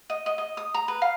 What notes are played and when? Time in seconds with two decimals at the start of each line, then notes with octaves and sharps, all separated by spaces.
0.10 D#5
0.26 D#5
0.38 D#5
0.57 D#6
0.74 A#5
0.88 B4
1.02 F5